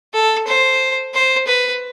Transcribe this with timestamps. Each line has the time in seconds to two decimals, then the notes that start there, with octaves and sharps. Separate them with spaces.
0.14 A4
0.47 C5
1.14 C5
1.47 B4